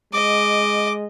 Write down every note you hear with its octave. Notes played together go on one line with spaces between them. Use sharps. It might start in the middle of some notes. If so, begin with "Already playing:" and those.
G#3 D#5 D6